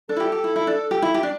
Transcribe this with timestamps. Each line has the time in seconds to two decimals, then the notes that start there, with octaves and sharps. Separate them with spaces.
0.09 D4 A4
0.16 E4
0.20 G4
0.32 G4
0.44 E4
0.56 E4
0.67 D4
0.91 G4
1.02 E4
1.14 G4
1.23 D4